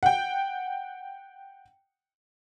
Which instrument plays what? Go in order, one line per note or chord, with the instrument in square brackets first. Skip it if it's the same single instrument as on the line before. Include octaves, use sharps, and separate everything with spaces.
[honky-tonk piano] F#5 G5